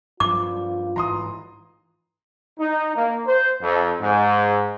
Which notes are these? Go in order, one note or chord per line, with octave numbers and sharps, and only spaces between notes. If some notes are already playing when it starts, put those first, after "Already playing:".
G2 F3 F4 D6
G#2 E3 A#5 C6 D#6
D#4
A#3
C5
F2
G#2